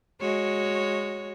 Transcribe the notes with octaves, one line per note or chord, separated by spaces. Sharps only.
G#3 F#4 C#5